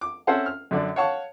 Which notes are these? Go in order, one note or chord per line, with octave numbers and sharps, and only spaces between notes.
D6
C4 C#4 A4 C5 E5 F#5
F6
F#2 D3 D5
C#5 F5 F#5 A5 C#6